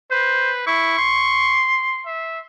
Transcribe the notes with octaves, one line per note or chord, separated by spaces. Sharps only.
B4 C5
E4 C#6
C6
E5